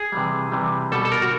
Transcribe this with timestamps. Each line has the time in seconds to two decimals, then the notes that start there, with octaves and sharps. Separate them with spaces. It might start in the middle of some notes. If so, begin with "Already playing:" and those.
Already playing: G#4
0.12 C3 E3 G3
0.52 C3 E3 G3
0.92 B2 G3 A4
1.05 A4
1.12 A#4
1.22 F#4